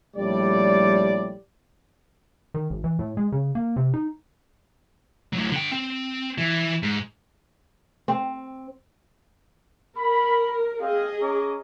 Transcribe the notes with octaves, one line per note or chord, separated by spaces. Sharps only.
A#1 A2 G3 D5
D#3
G#1
E3
A2
G#3
C#3
A#3
C3
D#4
A2 F#3
D3 G5
C4
E3
G#2
C4
A#4 B5
C4 G#4 D#5 F5
C#4 A#5 D6